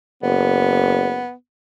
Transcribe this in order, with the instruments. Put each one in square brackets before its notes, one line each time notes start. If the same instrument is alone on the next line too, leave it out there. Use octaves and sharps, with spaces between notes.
[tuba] F#1 [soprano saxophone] B3